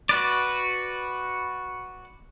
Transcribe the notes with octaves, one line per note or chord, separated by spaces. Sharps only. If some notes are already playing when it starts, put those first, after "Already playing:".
F#4 B4 D5